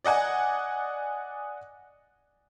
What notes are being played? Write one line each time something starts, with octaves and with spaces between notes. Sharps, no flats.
D5 D#5 F#5 G#5